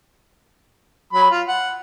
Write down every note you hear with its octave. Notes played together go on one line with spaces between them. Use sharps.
F#3 B5
F4
F#5